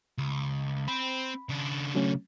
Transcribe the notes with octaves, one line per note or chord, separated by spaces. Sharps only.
C#2
C4 B5
C#3 D4
F#3 A3 C#4